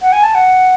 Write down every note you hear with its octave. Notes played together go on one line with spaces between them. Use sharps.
F#5
G#5
A5
F#5